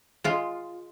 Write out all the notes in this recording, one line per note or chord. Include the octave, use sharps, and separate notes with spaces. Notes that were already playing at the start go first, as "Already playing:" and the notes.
G#3 F4